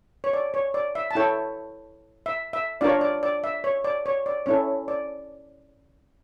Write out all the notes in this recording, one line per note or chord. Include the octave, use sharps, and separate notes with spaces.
C#5
D5
C#5
D5
E5
A5
E4 A4 C#5 G5
E5
E5
D4 F4 A#4 C#5 D5
D5
D5
E5
C#5
D5
C#5
D5
C#4 E4 A4 C#5
D5